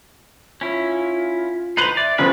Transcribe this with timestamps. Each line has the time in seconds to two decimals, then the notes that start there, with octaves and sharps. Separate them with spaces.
0.61 C#4 E4 F4
1.77 D#4 B4 C5 C7 F7
1.97 D5 E5
2.18 F1 C#3 F3 B4 G#5